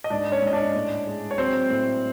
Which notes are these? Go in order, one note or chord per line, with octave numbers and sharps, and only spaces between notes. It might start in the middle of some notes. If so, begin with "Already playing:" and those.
D#5
G#2 D4 D5
C#4 C#5
G#2 D#5
D4 D5
A2
G#3
C#5
F#3 C4 C5
A2